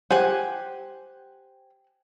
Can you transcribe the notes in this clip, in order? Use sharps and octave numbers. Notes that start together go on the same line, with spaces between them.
G4 C5 F#5 G#5 F#6